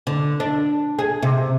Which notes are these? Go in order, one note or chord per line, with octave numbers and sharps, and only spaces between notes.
D3
D4
G#4
C3